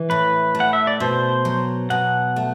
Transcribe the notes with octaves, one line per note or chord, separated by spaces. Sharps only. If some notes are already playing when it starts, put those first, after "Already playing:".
Already playing: E3
A2 B4
A3
F#5
E5
D5
B2 C5
F#3
B2 F#5
A3